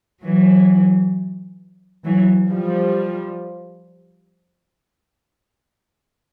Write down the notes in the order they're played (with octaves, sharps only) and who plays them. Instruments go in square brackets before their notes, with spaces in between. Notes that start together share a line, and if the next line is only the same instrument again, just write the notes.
[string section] E3 F#3
E3 F#3
F3 G3